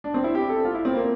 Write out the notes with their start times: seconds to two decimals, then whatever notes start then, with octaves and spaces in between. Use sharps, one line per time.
0.04 D4
0.14 C4
0.24 E4
0.35 G4
0.49 A4
0.65 F4
0.75 E4
0.85 C4
0.95 A#3